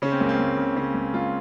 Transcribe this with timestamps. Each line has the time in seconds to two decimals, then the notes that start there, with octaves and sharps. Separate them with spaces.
0.02 C#3 C#4
0.12 C4
0.20 C#2 A#3
0.29 C4
0.39 C#2
0.57 C#3
0.76 C#3 C#4
0.94 C#2
1.14 C#2 F4